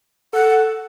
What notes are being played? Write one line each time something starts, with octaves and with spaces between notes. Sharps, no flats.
A4 F#5